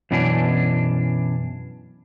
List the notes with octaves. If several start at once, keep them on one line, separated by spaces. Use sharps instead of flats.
F#2 B2 E3 C#4 D4